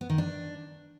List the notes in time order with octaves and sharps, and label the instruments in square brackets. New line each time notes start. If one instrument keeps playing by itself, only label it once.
[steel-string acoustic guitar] B3
D#3
D4